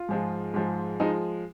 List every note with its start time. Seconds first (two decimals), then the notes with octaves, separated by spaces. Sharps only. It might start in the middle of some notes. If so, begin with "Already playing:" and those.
Already playing: F4
0.09 G#2 F3 G#3
0.54 G#2 F3 G#3
1.00 F3 G#3 D#4